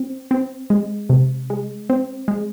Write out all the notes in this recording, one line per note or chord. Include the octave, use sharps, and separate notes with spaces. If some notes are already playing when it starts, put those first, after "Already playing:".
Already playing: C4
C4
G#3
C3
G#3
C4
G#3